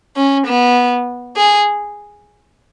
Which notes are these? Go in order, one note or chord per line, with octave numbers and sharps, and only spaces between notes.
C#4
B3
G#4